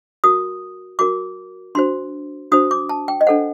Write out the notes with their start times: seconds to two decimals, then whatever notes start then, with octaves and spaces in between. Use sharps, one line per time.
0.24 F#4 A#4 D#6
0.99 F#4 A#4 D6
1.75 D4 F#4 C5 C6
2.52 D4 F#4 C5 D#6
2.71 D6
2.89 A5
3.08 G5
3.21 D#5
3.27 D4 A4 C5 F#5